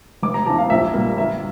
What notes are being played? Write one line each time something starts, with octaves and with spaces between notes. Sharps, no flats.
F1 D6
A#5
E2 E3 A5
F5
A#1 E5
A#2 G3 A#3
G1 E5